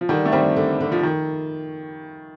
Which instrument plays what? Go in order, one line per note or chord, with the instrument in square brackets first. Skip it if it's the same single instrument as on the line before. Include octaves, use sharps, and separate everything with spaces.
[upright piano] F3
[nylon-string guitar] D3 [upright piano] D#3 G3
[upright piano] A3
[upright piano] D#3 G3 [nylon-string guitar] C4
[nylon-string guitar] D3
D3
[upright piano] F3
D#3